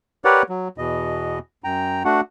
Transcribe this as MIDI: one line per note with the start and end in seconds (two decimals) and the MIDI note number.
0.25 0.42 67
0.25 0.42 70
0.25 0.42 71
0.25 0.42 73
0.25 0.42 74
0.25 0.42 78
0.49 0.68 54
0.78 1.39 40
0.78 1.39 47
0.78 1.39 75
1.64 2.03 42
1.64 2.03 79
1.64 2.03 82
2.05 2.21 57
2.05 2.21 62
2.05 2.21 66
2.05 2.21 78